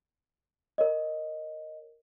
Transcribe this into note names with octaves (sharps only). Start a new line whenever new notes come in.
A#4 C#5 D#5